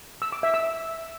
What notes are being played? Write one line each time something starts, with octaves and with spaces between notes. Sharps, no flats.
E6
D6
E5
E6